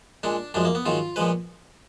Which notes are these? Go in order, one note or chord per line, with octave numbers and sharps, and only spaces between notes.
A#2 G#3 D4
F#2 F3 G#3 D4
A#3
B3
G#2 D#3 F#3 F4
A#2 F3 G#3 B4